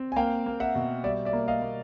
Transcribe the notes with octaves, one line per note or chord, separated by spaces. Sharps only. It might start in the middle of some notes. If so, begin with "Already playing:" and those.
Already playing: C4
G#5
A#3 F5 G5
A#3
E5 F#5
B2
G3 D5 E5
D5 E5
A#3
D#5 F5
A#3